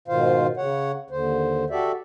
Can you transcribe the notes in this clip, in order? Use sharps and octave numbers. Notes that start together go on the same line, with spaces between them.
G#2 B2 D#3 F4 C5 F5
C#3 C#5 F#5
D#2 D3 C5
F#4 G4 A4 D5 E5